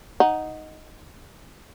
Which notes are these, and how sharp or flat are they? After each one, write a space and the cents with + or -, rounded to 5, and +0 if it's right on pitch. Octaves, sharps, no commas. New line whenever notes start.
D#4 +0 F#5 -5